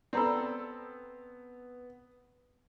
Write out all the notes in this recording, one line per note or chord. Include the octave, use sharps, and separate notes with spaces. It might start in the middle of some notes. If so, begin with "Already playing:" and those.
B3 C4 A4 D5 A#5 B5